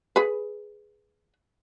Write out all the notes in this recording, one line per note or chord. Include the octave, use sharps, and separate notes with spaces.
G#4 B4